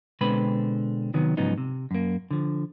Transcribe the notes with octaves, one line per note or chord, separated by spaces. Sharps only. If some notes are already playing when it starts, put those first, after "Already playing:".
B2 D3 G#3 C4 B4 B5
C3 D#3 F#3 B3
G#2 C#3 F3 F#3 B3 D#4
C3
F#2 A#3
D3 F3